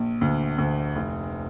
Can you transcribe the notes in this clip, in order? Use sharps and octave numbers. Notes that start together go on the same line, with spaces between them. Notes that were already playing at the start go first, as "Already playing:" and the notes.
Already playing: A#1
D2
D2
F1